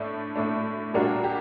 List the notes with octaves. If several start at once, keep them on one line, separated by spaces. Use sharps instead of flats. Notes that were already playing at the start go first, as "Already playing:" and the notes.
Already playing: A2 A3 D4
A2 A3 D4
A#2 G3 A#3 D4 F#4
G4